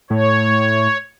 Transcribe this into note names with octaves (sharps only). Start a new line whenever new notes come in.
A2 C#5